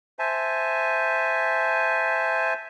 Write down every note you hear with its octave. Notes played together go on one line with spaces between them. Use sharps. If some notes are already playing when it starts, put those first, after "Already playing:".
C5 E5 G#5 A5